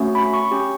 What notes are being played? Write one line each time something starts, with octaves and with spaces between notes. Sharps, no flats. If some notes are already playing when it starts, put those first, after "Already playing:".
Already playing: A3 C#4 F#4
B5
C#6
C#4 G4